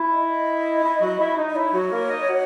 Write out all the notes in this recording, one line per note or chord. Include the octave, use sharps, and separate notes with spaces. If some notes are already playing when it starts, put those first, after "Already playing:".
Already playing: E4
D#5
E4
F#3 F#4
E4
D#4
D#5
E4 C#5
F#3 F#4
A#3 A#4
D#4 D#5
F#4 F#5